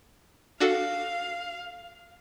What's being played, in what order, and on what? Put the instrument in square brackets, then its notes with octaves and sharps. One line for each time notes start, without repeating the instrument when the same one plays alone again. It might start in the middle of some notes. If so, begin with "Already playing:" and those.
[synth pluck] D4 F#4 A4 [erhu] F5